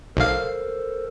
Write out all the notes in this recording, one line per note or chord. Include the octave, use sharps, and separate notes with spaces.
B1 A4 A#4 C5 F5